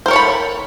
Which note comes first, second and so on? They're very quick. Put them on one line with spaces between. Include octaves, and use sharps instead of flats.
C5 A#4 C#5 A4 B5